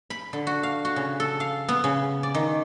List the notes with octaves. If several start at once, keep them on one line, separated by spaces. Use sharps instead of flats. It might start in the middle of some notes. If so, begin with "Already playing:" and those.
B5
D3
F#4
F5
F#4
C#3
A4
F5
B3
C#3
D5
D#3